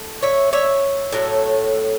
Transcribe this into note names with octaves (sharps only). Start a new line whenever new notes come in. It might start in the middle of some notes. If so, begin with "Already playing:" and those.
Already playing: A3
C#5 E5
C#5 E5
A2 F#3 A3